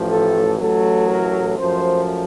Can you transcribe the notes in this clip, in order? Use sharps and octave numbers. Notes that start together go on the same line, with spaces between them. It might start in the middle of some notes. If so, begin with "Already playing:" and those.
Already playing: A1 A2 F3
A4
A1 A2 F#3 A3 A4
A#4
F#2 F3 A3 C5